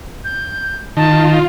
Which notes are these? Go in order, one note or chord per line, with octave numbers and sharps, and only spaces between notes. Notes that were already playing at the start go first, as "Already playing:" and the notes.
G6
D#3 F4 A5